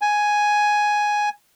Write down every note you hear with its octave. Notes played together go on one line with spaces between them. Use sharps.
G#5